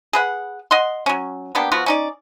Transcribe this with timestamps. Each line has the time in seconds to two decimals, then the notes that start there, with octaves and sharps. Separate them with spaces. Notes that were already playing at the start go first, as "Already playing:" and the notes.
0.13 G#4 B4 F#5
0.71 D#5 F#5 C6
1.06 F#3 C#4
1.55 A#3 B3 D4 G4
1.72 F3 B3 F4 F#4
1.86 C#4 D#4 D5